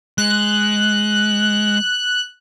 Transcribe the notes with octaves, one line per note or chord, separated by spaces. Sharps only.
G#3 F#6